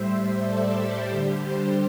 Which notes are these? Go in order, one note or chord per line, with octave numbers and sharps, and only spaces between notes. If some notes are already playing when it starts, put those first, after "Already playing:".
Already playing: A2 G3 C5 E5
A4 D5
G4 C5
D3 G3 G4
G4 C5